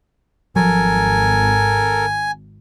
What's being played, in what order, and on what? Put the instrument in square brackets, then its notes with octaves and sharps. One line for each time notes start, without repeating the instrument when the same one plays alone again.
[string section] G#1 [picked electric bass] F3 F#3 [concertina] A4 A#4 [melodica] G#5